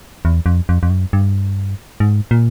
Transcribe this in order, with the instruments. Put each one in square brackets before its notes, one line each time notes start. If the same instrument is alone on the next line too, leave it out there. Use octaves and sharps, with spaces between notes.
[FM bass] E2
F2
F2
F2
F#2
G2
G#2
A#2